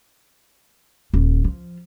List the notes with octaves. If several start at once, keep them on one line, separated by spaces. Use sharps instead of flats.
D#1
F3